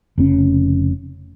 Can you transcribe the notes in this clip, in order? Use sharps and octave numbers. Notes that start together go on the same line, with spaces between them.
F1 C#3 C#4